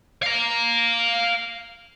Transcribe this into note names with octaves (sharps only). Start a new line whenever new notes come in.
F5 A#5